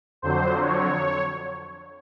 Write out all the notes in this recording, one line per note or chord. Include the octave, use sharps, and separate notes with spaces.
F2 D3 F#3 C5
C#5